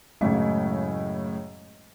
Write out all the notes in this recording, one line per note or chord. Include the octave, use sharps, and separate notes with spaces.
F#2 A2 C#3 G#3 A3 D#5